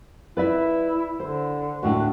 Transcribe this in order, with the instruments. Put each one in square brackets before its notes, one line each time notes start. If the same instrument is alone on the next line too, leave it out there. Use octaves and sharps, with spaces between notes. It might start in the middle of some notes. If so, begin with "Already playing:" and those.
[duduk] E4 [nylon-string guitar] B4 D5 E5
[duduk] D3 [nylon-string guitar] C5
[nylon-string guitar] D2 A2 D4 [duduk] F#4